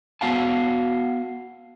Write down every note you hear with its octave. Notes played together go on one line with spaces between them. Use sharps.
B3 F#4 F5 F#5 A5